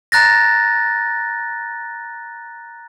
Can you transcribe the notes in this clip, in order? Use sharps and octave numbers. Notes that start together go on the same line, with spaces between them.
A#5 F#6 A6 A#6